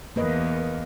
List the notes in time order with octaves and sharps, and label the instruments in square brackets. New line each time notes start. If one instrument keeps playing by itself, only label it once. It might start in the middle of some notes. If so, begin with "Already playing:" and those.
[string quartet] E2 [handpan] A#3 B4 D#5